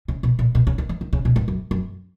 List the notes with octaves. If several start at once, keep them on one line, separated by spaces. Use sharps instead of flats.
C#3
B2
A#2
B2
C#3
D#3
E3
D#3
C#3
B2
G#2
F#2
F#2